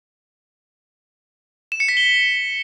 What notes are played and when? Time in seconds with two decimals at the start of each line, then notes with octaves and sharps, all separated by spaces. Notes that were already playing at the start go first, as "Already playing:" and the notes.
1.72 E7
1.80 C#7
1.89 B6
1.97 G7